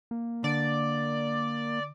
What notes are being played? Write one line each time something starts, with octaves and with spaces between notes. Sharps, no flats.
A#3
D3 D5